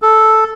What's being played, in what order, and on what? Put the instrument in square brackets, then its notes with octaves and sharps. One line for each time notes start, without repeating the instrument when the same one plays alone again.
[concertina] A4